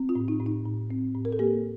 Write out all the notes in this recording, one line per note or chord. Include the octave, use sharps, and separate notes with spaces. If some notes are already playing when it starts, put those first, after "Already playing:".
Already playing: C4
F4
A2
D#4
A2
D#4
A2
C4
A2
A#4
A4
A#3 G4